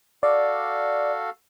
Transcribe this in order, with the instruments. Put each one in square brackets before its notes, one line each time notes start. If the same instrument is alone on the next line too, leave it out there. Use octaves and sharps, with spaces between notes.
[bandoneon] F#4 A4 F5 [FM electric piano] D5